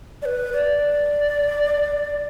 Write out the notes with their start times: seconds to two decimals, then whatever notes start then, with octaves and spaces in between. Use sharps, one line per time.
0.22 D5
0.25 B4
0.53 D5